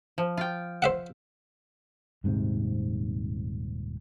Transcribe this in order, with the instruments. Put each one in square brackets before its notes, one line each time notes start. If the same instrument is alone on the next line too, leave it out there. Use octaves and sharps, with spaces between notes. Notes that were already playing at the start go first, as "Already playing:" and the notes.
[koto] F3
F4 G5
[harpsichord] C5 E5 F#5
[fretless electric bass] D#1 G#2 C3 C4